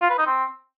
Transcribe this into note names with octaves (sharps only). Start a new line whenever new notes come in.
F4
B4
D#4
C4